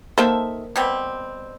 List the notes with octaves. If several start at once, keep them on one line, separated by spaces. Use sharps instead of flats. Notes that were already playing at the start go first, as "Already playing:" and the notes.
D#3 A#3 A4 C5 E5
B2 G3 C4